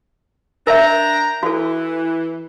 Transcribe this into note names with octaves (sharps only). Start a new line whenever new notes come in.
D4 A#4 D#5 E5 G5 A#5
E3 F#4 A4